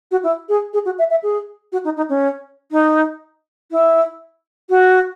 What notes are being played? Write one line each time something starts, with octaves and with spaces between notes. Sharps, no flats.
F#4
E4
G#4
G#4
F#4
E5
E5
G#4
F#4
D#4
D#4
C#4
D#4
E4
F#4